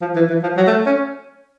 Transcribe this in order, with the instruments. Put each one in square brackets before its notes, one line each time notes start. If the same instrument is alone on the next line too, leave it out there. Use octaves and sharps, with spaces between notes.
[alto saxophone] F3
E3
E3
F3
F#3
A3
C#4